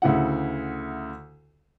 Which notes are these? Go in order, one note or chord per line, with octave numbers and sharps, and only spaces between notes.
D2 C#3 E4 F#5